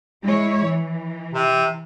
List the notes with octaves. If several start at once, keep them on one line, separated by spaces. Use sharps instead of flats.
G#3 E4 C#5
E3
C3